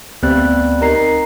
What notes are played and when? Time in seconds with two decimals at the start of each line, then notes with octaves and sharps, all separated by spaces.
0.23 D2 G3 B3 C4 F#6
0.82 D#3 A#5 C7